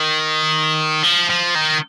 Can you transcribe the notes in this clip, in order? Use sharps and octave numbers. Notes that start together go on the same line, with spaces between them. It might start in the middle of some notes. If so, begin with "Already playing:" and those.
Already playing: D#3
F3
F3
D#3